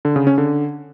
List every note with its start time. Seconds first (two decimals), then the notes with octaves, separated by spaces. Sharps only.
0.05 D3
0.16 C#3
0.27 C#4
0.38 D3